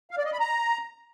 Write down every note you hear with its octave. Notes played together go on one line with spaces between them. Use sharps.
F5
D5
D#5
B5
A#5